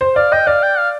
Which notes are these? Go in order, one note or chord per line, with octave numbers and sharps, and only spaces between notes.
C5
D5 F5
D#5 G5
D5 F5
G5
F5